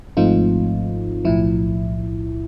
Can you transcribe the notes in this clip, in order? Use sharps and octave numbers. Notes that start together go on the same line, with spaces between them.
G#1 G#2 F3 A3 C4 D#4 F4
B1 A2 F3 E4